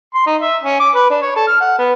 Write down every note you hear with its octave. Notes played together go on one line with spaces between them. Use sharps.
C6
D#4
E5
C#4
D6
B4
D4
C#5
A4
F6
F#5
B3